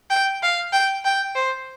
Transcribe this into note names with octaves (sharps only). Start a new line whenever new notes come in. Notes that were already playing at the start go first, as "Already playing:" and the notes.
G5
F5
G5
G5
C5